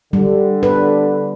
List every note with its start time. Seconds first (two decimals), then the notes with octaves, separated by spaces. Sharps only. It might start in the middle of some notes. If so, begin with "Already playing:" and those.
0.13 D3 G3
0.63 B4